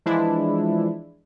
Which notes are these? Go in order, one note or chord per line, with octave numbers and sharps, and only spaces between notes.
E3 F3 G#3 D4 E4